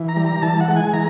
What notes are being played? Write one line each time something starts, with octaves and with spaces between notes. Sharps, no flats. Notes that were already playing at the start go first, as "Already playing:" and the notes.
Already playing: E3
A#5
G3
A#5
E3 A5
F#5
G#3
G#5
E3 A#5